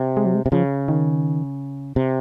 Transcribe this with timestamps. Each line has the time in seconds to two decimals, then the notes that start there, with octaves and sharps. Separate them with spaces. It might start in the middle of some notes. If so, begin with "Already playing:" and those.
Already playing: C3
0.17 G#3
0.25 F#3
0.35 G#3
0.46 C3
0.52 C#3 F3
0.88 D#3
1.96 C3